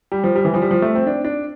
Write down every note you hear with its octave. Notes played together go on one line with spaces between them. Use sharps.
G3
F3
G3
E3
F3
G3
F3
A3
C4
D4
D4